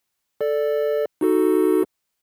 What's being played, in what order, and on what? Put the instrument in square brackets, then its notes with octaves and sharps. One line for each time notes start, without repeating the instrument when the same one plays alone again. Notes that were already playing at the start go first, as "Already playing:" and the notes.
[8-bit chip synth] A4 D5
D#4 F#4 A4